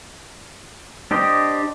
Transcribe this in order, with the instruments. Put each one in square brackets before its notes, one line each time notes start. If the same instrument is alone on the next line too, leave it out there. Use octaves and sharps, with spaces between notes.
[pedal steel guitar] D4 G4 C5 D#5